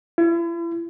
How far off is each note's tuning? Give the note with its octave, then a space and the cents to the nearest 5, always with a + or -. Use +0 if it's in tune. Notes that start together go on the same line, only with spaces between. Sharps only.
E4 +40